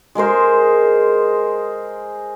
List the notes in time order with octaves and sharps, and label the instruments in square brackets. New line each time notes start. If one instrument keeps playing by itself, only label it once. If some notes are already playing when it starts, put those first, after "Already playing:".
[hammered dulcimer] G#3 G#4 A#4 C5